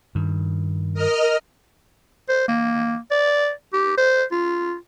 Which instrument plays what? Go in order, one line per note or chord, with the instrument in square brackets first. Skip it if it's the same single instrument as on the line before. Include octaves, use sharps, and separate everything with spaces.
[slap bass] G2 D#3
[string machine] A#4 D#5 F6
[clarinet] C5
A#3
D5
G4
C5
F4